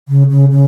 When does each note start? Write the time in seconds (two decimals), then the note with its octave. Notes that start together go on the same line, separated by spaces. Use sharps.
0.08 C#3
0.30 C#3
0.51 C#3